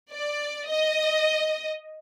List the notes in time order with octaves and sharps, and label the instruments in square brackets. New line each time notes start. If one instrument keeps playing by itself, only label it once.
[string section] D5
D#5